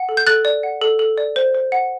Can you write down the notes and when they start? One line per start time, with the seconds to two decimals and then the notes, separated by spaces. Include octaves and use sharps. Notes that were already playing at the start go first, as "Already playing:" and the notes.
Already playing: F#5
0.09 A4
0.17 G6
0.27 A4 F#6 A6
0.45 D5
0.63 F#5
0.81 A4
0.99 A4
1.18 D5
1.36 C5
1.55 C5
1.72 F#5